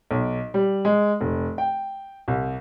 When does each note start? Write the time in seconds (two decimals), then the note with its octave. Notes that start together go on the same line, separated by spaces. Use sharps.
0.11 B1
0.54 G3
0.85 G#3
1.21 F1
1.58 G5
2.28 C2